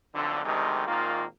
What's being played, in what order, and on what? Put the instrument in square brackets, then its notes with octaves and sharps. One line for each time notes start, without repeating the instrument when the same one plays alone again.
[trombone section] B1 F2 D3
D2 C3 D#3 G3 G#3
G#1 A#2 D#3 A#3 F4